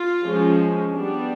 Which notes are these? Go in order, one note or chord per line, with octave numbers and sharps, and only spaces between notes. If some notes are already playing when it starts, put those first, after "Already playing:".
Already playing: F4
F3 G#3 C#4
G3 B3 D4